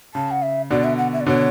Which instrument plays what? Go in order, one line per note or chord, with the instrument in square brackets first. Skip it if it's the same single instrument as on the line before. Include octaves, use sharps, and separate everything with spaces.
[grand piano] C#3 [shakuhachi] A5
[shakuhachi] F#5
E5
[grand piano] B2 D3 [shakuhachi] D5
[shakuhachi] E5
F#5
E5
D5
[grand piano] B2 D3 [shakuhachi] C#5